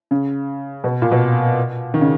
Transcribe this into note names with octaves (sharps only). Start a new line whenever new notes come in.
C#3
B2
A#2
B2
D#3
C#3